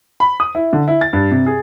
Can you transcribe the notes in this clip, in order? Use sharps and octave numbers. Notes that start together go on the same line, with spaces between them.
B5
D#6
E4
D3
E4
A6
G2
C3
G#4